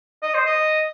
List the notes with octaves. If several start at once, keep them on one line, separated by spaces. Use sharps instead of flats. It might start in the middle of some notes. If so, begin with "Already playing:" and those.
D#5
C5
D#5